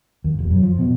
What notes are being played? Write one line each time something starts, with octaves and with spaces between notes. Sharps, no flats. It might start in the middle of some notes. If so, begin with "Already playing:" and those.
D#2
E1
F#2
F3
B2